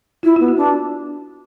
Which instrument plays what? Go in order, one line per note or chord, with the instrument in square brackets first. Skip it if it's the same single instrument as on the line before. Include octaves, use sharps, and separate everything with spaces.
[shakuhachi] E4 [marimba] F4
[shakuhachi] B3 [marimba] F4
[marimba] F#4
[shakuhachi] D4